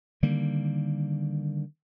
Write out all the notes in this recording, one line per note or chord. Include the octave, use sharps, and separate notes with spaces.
D3 D#3 G3 A#3